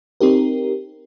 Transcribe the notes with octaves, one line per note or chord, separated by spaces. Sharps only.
C4 D#4 G4 A#4